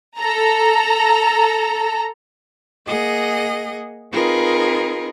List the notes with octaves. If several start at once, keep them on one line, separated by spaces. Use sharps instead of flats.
A4 A#5
A#3 G#4 D#5 F#5 A#6
C4 D#4 F4 G#4 A#4 B4